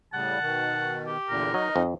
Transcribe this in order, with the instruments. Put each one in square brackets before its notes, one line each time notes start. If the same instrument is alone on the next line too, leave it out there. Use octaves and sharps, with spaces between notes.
[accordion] A2 C#3 G3 [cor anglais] F#5 [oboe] A5
[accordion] B2 D#3
[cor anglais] G4
[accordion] E2 A#2 D3 [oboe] A#4
[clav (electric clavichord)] F#3 [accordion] D#4 [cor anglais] D#5
[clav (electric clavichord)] F2